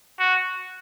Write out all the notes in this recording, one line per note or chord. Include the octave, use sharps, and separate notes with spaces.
F#4